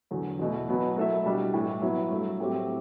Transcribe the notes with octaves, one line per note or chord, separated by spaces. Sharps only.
E2 D3 F#3
E2 B2 A3
B2 F#3 B3
F#3 A3 E4 A4 E5
B2 G3 D4 F#4
A2 E3 A3
F#3 B3 E4
G2 F#3 A3
A2 F#3 A3 C4 G4